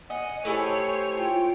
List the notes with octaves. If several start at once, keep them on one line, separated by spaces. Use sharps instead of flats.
D#5 F#5 G#5
A3 E4 G4 C5 C#5
G#5
F4 G5